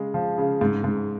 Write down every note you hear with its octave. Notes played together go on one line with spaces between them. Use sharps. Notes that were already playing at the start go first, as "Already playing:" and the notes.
Already playing: C#3 G#3
F3
C#3
G#2
G#2